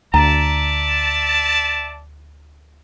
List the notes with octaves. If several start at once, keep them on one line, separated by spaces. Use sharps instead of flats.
D2 D5 E5 A5 A#5